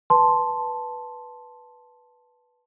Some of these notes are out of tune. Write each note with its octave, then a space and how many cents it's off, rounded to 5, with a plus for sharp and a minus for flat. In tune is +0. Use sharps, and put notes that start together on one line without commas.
B4 -10 A5 -5 C6 +0